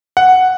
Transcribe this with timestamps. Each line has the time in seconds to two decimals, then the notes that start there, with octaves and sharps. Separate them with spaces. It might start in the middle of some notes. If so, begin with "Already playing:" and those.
0.17 F#5